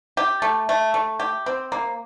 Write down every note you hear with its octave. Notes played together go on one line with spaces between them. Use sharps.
G4
A3
A3
A3
G4
C4
A#3